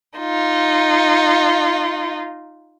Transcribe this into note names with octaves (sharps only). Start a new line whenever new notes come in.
D#4 F4